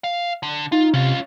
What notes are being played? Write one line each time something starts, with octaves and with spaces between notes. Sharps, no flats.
F5
D3
D#4 F4
C3 C#4 F4